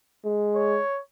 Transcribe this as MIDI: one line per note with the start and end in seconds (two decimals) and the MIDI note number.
0.25 0.78 56
0.56 0.99 73